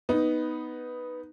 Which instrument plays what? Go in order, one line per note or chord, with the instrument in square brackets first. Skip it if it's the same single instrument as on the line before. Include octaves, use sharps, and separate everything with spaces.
[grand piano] B3 D#4